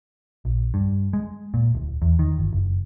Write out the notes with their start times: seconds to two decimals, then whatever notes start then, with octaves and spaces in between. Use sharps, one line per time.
0.45 A#1
0.74 G2
1.13 G#3
1.54 A#2
1.75 D1
2.02 E2
2.19 D#3
2.38 G1
2.53 F#1